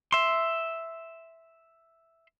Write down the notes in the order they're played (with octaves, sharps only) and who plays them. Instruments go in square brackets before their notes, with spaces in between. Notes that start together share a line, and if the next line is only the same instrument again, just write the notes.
[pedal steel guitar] E5 C6